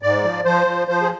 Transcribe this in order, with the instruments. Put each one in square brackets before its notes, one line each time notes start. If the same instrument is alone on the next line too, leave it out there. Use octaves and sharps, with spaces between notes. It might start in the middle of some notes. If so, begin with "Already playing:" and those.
[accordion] G#2 D5
F3
F3 C5
F3
F3 C5
G#4